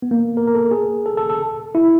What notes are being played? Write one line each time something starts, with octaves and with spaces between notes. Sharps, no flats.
B3
A#3
A#4
A#4
A4
G#4
A4
A4
A4
E4